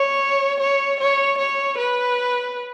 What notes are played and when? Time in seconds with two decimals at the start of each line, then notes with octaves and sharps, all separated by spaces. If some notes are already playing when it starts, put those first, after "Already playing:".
Already playing: C#5
0.60 C#5
1.00 C#5
1.38 C#5
1.78 B4